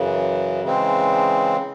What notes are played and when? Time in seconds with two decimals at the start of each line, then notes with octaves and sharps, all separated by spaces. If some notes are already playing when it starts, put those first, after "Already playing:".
Already playing: F#2 C#3 E3
0.64 C#3 E3 G#3 C4